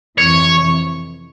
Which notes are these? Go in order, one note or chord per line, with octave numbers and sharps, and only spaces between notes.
F2 C3 E3 C#5